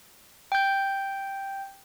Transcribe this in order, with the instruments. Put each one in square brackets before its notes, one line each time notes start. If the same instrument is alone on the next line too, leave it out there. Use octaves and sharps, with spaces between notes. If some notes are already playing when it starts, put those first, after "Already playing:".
[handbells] G5 G6